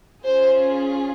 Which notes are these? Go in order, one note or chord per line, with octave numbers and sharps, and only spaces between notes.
C#4 F4 G#4 C5